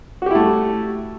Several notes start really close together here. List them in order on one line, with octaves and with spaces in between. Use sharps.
F#4 G4 E4 A3 G3